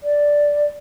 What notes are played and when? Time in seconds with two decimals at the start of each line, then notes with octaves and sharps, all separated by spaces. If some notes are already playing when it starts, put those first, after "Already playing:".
0.03 D5